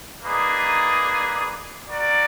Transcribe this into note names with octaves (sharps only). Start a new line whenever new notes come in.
A#3 D#4 G#4 B4 D5
F#4 A#4 D5